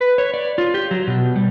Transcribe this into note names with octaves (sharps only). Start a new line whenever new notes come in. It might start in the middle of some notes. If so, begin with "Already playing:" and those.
B4
C#5
D5
F4
G4
F#3
B2
G3